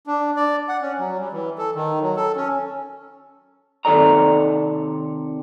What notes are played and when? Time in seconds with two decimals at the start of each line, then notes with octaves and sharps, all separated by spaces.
0.07 D4
0.36 D5
0.68 F#5
0.82 C#4
0.99 F#3
1.19 G3
1.32 E3
1.58 A4
1.75 D#3
2.02 F#3
2.16 A4
2.36 C#4
3.85 C3 D#3 A4 D5 A#5